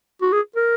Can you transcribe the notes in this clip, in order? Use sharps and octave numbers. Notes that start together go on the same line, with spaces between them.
F#4
G#4
A#4